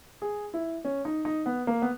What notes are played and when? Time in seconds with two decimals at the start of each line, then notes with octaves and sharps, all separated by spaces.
0.22 G#4
0.54 E4
0.85 C#4
1.05 D#4
1.25 D#4
1.46 B3
1.67 A#3
1.82 B3